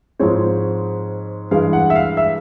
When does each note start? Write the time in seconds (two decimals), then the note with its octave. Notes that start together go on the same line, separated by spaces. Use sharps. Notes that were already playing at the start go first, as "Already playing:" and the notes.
0.19 G#2 F3 G#3 C4 C#5
1.51 G2 E3 G#3 F5
1.73 F#5
1.90 E5
1.95 F5
2.17 E5